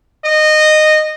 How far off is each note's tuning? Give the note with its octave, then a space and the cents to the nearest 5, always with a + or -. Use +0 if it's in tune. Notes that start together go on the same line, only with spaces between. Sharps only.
D#5 -15